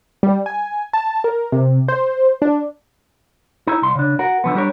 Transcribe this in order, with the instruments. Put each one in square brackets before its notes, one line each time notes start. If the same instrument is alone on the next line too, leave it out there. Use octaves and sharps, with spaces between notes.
[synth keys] G3
G#5
A5
A#4
C3
C5
D4
[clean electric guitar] D#4 E4
C2 C6
C#3 D4
F#4 A#4 F#5
D3 F3 B3
G3 D4 G4 A#4 C#5